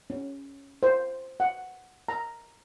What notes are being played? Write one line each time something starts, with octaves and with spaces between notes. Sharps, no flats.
C#4
C5
F#5
A#5